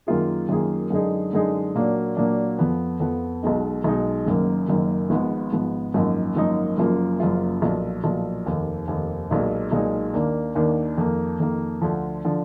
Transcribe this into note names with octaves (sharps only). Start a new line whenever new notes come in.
F#2 D#3 A#3 F4 G#4
F#2 D#3 A#3 F4 G#4
F#2 D3 G#3 D#4 G#4
F#2 D3 G#3 D#4 G#4
A#2 F#3 A#3 D4
A#2 F#3 A#3 D4
F2 F3 B3
F2 F3 B3
B1 B2 G#3 D#4
B1 B2 G#3 D#4
F#1 F#2 D#3 A#3
F#1 F#2 D#3 A#3
G#1 G#2 F3 B3
G#1 G#2 F3 B3
G#1 F#2 F3 A#3 D#4
G#1 F#2 F3 A#3 D#4
F#1 F#2 F3 A#3 F4
F#1 F#2 F3 A#3 F4
B1 A#2 F3
B1 A#2 F3
F1 D#2 D#3
F1 D#2 D#3
B1 A#2 G#3 D#4
B1 A#2 G#3 D#4
D#2 D#3 A#3 D4
D#2 D#3 A#3 D4
F2 D#3 A#3
F2 D#3 A#3
D2 D3 F3
D3 F3